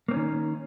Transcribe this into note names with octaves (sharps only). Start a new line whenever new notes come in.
D#3 A#3 C4 C#4